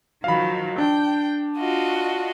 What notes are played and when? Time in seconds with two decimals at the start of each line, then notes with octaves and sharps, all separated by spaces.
0.24 D#3 F3 F#3 F5 B5
0.78 D4 G5
1.57 F4 F#4 D#5